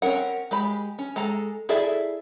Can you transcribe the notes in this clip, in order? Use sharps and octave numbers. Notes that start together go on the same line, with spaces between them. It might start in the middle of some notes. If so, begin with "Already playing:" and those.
C4 C#4 F#4 A#4 F#5
G#3 G4 B5
C#4
G#3 A4 A#5
E4 G#4 A4 D5 E5